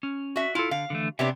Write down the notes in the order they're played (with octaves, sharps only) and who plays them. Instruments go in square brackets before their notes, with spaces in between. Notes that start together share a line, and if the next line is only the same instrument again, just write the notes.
[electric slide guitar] C#4
[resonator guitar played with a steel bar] F#4 E5
[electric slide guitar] E4 A4 [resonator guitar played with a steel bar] F4
[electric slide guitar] D3 [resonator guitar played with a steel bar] F5
[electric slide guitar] D3 E3 A3
[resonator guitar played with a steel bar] C3 B3 D4 [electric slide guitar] G4 C#5 E5